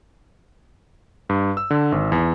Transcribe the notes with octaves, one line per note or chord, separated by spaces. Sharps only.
G2
E6
D3
G#1
E2